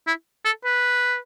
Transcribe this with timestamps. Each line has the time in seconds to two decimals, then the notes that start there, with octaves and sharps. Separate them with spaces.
0.07 E4
0.45 A4
0.65 B4